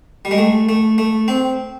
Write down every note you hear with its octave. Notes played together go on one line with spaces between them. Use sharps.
G3
G#3
A3
A3
A3
C4